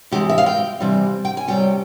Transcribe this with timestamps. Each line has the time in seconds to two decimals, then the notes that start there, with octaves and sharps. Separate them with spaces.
0.12 C3 E3 G#3 G4
0.29 E5
0.38 F5
0.46 G5
0.80 C3 E3 G3
1.25 G5
1.37 G#5
1.48 C3 G3 C#4 G5